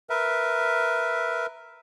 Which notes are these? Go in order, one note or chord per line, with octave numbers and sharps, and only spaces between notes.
A#4 B4 E5